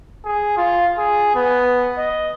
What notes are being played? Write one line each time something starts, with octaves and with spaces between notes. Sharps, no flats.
G#4
F4
G#4
B3
D#5